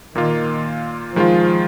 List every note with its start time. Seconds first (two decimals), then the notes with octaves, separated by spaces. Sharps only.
0.15 A#2 D#3 A#3 F4
1.16 D#3 F3 G#3 F4